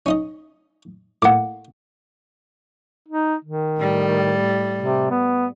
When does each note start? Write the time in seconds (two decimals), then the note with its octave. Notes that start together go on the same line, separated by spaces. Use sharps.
0.06 C#4 D#4 D#5
1.22 A2 A#3 F#5 D6
3.08 D#4
3.45 D#3
3.79 A2 G3
4.80 C3
5.11 B3